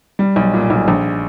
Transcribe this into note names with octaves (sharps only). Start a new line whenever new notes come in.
G3
B1
A#2
B1
A#1